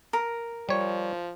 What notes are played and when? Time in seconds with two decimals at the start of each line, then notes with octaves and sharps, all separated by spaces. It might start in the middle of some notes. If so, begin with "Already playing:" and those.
0.13 A#4
0.69 F3 G3 C#5